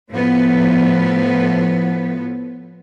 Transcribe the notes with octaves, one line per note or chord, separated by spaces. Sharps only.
A2 F3 B3